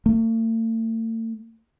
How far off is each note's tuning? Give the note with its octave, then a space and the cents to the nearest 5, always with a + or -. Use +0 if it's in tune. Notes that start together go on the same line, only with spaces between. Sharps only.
A3 +45